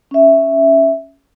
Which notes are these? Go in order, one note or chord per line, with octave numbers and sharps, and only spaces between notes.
C#4 E5